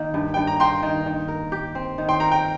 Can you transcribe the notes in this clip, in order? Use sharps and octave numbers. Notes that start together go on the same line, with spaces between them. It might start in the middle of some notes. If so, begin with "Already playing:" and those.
Already playing: D#3 A#3
G2
G2 G5
A#5
A#3 G5 C6
D#3
D#3
A#4
G4
C4
D#3
G5 C6
A#4 A#5
G5